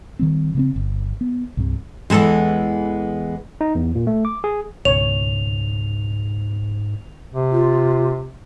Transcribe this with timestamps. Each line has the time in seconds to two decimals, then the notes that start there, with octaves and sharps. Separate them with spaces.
0.19 D#3 G3 C4
0.55 C#3 A#3 C4
0.76 G1
1.21 B3
1.57 C2 G2 C3
2.10 E2 E3 G#3 B3 A4
3.61 D#4
3.75 E2
3.95 A#2
4.07 A3
4.25 D6
4.44 G#4
4.85 C#2 G#2 B2 C#5 F7
7.32 C3
7.52 F4